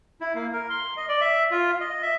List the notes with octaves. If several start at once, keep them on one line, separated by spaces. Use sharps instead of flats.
E4
A#3
A#4
C6
D#5
D5
E5
F4
D#5
E5